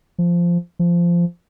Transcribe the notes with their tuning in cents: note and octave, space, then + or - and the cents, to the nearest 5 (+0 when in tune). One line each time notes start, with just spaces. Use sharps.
F3 -10
F3 -15